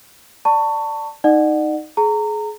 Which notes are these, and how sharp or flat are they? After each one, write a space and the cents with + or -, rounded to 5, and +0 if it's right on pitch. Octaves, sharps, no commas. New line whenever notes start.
D5 +0 A5 +25 C#6 +5
D#4 +0 D5 +40 F#5 +0
G#4 +30 A#5 -25